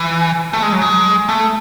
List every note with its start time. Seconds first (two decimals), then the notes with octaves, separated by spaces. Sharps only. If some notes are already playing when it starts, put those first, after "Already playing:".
Already playing: E3
0.53 A3
0.63 G#3
0.72 F#3
0.82 G#3
1.29 A3